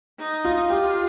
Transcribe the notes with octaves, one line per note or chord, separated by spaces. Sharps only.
D#4
F4
F4 G4